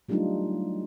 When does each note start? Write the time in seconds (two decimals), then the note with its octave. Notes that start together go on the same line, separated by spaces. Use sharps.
0.09 F#3 G3 A3 D4 D#4 F4